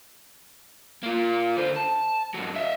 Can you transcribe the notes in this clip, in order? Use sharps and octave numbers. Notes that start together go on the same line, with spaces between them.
A#3 F4
D3 C5
A5
G#2 F#3
D#5 E5